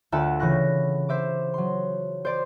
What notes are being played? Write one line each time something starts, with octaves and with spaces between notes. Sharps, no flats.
D2 F4 E5 F#5 A5 F#6
C#3 E3 C#6 F#6 A#6
C5 E5 D6
F#3 C6
C5 D5 C6